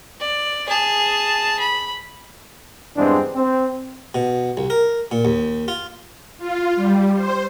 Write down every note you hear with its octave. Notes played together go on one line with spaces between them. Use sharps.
D5
G#4 A5
B5
E2 G2 G#3 C4 D4
C4
B2
C2
A#4
A#2
D#2
F4
F4
G3
C5